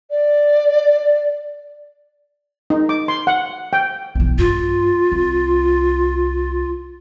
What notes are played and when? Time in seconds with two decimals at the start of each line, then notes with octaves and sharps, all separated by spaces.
0.11 D5
2.70 D#4
2.89 D6
3.08 C6
3.27 F#5
3.73 G5
4.15 B1 E3
4.38 G2 F4
5.12 C2